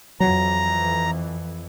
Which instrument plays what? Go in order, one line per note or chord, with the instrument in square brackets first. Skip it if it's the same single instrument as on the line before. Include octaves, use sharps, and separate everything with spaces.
[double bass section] F2 E3 [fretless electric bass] F#3 [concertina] A#5